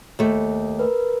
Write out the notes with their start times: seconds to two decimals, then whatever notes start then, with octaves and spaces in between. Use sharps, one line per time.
0.19 D#2 A3
0.79 A#4 B4